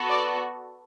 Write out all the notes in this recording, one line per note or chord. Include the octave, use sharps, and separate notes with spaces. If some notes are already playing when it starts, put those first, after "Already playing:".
Already playing: B3 F#4 A4
D5